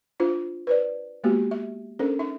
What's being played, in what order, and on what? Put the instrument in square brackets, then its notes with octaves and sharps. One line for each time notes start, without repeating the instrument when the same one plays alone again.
[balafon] D4 F4 C5
B4 C5 D5
G#3 A#3 B3 F#4 G4
E5
C#4 D4 A4 A#4 C5
D#4 E5